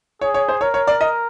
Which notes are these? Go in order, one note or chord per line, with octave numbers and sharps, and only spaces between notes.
G#4 C#5
C#5
C5
A#4 C#5
C#5
D5
D#5